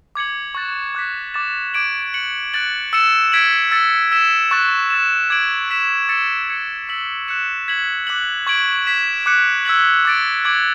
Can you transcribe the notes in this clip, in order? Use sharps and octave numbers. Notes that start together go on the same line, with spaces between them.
D6 G#6 C#7 F#7
C#6 F#6 A6 E7
D6 F#6 B6
D6 A6 E7
D6 G#6 D7 F#7
F#6 C#7 F#7
F#6 A6 D7 F#7
E6 A6 C#7 E7
G#6 B6 D7 F#7
E6 A6 C#7
E6 B6 E7
C#6 F#6 A6
E6 A6 E7
D6 G#6 D7 F#7
F#6 B6 E7
E6 A6 C#7 E7
G#6 C#7 F#7
E6 B6 F#7
F#6 C#7 E7
G#6 B6 F#7
D6 F#6 B6 F#7
C#6 G#6 D7 F#7
G#6 B6 E7
D6 F#6 C#7
E6 G#6 B6 F#7
D6 A6 D7
D6 G#6 D7 F#7